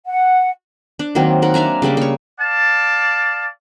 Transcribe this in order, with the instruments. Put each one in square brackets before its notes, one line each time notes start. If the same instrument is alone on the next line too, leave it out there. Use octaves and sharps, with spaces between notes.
[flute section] F#5
[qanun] D4
D#3 F#3 A#3 C4
D#4 A#4 F#5
D4 E5 G#5 A#5
C#3 G3 A#3 D4
A#3 C#5
[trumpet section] D5 F5 A5